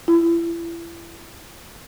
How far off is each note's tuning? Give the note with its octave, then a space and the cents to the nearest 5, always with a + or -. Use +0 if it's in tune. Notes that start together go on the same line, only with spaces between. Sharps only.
E4 +35